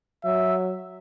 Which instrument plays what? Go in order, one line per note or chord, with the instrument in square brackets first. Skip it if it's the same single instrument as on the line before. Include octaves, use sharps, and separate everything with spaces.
[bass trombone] F#3 [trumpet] E5